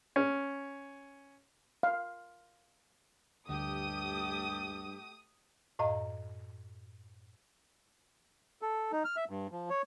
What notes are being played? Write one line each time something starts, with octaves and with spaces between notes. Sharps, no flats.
C#4
F5
D2 G2 A3 G4 D#6
F#2 A2 D#5 F5 A#5
A4
D#4
F6
E5
G2
F3
C#5